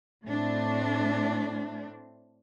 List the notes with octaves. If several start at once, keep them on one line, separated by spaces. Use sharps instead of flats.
A2 A3 C4 D4